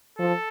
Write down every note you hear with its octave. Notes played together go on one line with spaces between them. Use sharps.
F3 A4